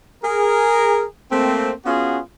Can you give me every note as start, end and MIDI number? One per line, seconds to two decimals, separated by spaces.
0.24 1.04 68
0.24 1.04 70
1.32 1.71 57
1.32 1.71 58
1.32 1.71 60
1.85 2.18 59
1.85 2.18 61
1.85 2.18 65
1.85 2.18 66
1.85 2.18 68